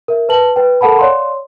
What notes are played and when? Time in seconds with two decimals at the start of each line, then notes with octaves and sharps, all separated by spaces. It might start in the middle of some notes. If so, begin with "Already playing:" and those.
0.08 A#4 E5
0.29 B4 A5 F#7
0.56 B4 G5
0.81 A4 A#4 F#5 A5 B5
0.99 C#5 D5 F5 C6